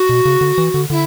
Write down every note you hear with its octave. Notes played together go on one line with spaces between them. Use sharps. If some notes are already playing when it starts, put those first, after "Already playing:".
Already playing: F#4
B2
C#3
D3
E3
D3
D3 E4